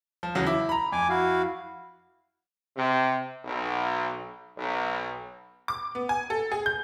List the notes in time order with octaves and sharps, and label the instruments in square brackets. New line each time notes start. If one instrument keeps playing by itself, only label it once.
[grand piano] F3
E2 C#3 F#3
E4 D6
A#5 B5
[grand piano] F2 [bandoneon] G#5 D6
[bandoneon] E4 F#4 F5
[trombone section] C3
B1
B1
[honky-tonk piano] D6
B3
G#5
A4
G#4
G6